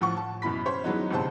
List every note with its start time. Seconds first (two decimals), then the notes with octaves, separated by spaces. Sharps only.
0.01 A1 F3 F#5 C#6
0.17 A5
0.42 F#2 B2 E3 B5 B6
0.65 C#4 C5 C#5 C6
0.84 E3 F#3 G#3 B3 C#4 D#4
1.11 G1 G#2 C3 C5 A5